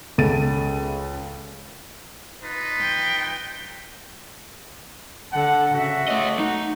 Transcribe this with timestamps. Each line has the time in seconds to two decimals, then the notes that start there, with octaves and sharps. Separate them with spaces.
0.18 C#2 C#3 G#3 A4 A6 D#7
2.43 D#4 F4 B4
2.81 G5
5.33 D3 A4 F#5
5.74 C#3 F#4 E5
6.08 A3 C#5 D#5
6.39 D#4